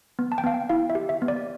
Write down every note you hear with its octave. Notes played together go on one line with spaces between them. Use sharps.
B3
A5
G5
B3 F5
G5
E4 F5
E5
G4
E5
B3
D5